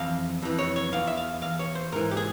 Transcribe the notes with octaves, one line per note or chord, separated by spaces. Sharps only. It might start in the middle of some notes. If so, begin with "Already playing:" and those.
Already playing: F2 E3 F5
F2 E3
C#5
C#5
E2 E3 F5
E5
F5
E2 E3 F5
C#5
C5
G#2 E3 A#4
G4
G#4